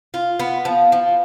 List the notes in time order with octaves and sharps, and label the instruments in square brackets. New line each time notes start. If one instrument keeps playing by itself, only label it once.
[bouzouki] F4
B3
F3
F3